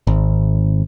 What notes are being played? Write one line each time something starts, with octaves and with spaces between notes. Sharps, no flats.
G#1